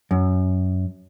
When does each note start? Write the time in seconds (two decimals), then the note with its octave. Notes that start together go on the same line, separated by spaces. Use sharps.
0.11 F#2